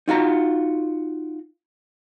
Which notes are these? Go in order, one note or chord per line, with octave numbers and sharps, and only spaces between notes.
D#4 F4 F#4 A#5